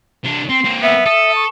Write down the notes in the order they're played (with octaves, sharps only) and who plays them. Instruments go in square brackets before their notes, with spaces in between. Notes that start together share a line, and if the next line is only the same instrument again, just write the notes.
[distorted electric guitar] C3 D4
[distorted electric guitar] C4 [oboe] C6
[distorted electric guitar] A#3 C4
[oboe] B3 [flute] E5
[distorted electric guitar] A4 [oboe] D#6
[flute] C#6